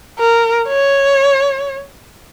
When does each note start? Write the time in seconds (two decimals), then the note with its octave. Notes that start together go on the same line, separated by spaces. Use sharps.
0.19 A#4
0.68 C#5